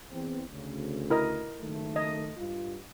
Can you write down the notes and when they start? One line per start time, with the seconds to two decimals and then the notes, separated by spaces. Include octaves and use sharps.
0.12 E2 C4
0.50 D2 C#3
1.10 E4 A#4 D#5
1.60 F#1 D#3 A3
1.96 D#5
2.36 G2 F4